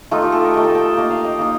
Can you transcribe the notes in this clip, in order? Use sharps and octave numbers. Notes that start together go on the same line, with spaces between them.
A3 D#4 F4
G4
A4
A#4
A3 D#4 G5
A5
G5
A5
A#3 D#4
F5
D#5
A#3 D#4